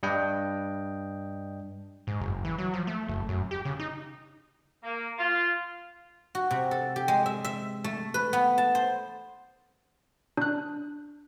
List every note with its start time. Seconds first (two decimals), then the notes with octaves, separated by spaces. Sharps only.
0.03 G2 D4 D#5 G5
2.07 G#2
2.21 F#1
2.45 E3
2.58 F#3
2.74 F3
2.87 A3
3.08 F#1
3.29 F#2
3.51 G4
3.65 C#3
3.79 D#4
4.83 A#3
5.18 F4
6.35 F#4
6.51 C3
6.71 A4
6.96 G4
7.08 G#3
7.26 E5
7.44 E5
7.84 A3
8.14 B4
8.33 B3
8.58 A5
8.75 C5
10.37 D4 F#6